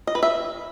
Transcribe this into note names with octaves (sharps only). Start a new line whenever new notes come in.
D#5
B4
E5